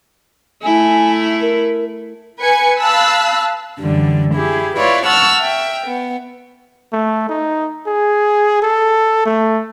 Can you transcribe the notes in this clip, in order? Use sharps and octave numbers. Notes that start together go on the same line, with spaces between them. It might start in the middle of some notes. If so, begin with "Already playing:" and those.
A3 E4 G#5
A#4
B4 G#5 G#6 C#7
F5 A5 B5 E6 F#6
F#2 D3 E3 G3
E4 G4 G#4
E4 F4 B4 C#5 D5
F#5 A5 C#6 E6 F6
E5 G5
B3
A3
D#4
G#4
A4
A3